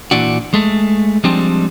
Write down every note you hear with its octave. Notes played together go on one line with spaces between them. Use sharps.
A#2 E3 D4 F#4
G#3 A3
F3 G3 G#3 C4 D4